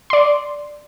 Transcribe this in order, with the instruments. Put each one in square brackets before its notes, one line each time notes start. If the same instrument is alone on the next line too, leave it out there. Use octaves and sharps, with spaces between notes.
[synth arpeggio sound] D5 C6